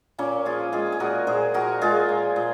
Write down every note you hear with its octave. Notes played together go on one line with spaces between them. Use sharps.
A#2 A#3 C#4
F3 F4 G#4
G#3 F4 G#4
G#4
A#2 F#4 A#4
A#2 G#4 C5
F3 F#4 A#4
G#3 F4 G#4
A#2
A#2